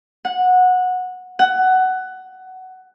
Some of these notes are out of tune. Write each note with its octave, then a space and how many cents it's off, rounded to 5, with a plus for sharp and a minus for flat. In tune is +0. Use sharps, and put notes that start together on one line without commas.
F#5 -15
F#5 +15